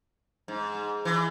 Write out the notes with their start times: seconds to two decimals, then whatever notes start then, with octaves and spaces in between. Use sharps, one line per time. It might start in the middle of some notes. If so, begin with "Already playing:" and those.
0.48 G#2
1.05 E3